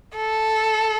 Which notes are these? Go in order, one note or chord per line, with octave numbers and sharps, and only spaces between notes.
A4